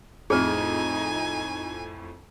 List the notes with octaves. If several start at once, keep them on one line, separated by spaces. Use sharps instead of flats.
F2 A2 D#4 G#4 B4 G#5